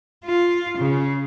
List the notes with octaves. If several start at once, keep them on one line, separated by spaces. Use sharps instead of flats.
F4
C#3